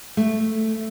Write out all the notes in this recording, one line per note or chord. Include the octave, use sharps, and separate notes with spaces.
A3